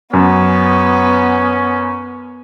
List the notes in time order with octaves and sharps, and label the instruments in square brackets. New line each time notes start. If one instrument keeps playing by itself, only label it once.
[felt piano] F#2 [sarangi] B3 [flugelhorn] C#4